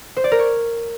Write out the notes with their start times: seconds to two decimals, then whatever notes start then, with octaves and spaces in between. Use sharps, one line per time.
0.17 C5
0.24 D5
0.32 A#4
0.39 C#5